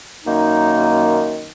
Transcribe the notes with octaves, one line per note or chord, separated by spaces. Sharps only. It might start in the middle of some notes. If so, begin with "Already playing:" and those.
F#2 D#3 A#3 D#4